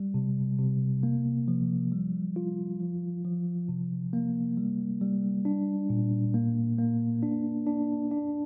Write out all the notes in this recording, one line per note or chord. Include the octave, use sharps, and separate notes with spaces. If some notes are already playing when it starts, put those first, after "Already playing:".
Already playing: G3
C3
C3
A#3
F3
G3
F4
F3
F3
C3
A#3
G3
G3
D4
A#2
A#3
A#3
D4
D4
D4